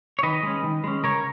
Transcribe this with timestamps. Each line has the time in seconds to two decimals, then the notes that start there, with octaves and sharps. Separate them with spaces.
0.19 C#5
0.23 D#3 B4 D#5
0.43 G#3 C#4
0.64 D#3
0.84 G#3 C#4
1.03 C#3 A#4 C#5